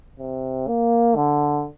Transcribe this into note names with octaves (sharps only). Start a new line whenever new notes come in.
C3
A#3
D3